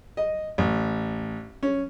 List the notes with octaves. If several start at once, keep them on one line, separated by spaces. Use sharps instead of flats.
D#5
A1
C#4